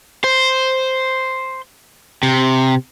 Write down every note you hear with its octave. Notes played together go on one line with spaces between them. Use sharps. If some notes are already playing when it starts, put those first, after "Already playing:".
C5
C3